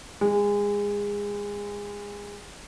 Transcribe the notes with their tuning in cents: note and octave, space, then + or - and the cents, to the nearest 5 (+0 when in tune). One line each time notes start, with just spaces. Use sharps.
G#3 -25